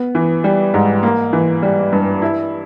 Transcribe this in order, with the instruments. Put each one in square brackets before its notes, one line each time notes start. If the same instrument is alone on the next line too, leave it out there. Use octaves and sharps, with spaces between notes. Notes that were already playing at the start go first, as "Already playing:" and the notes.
Already playing: [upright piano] B3
E3
G3
G#2
A#3
E3
G3
G2
E4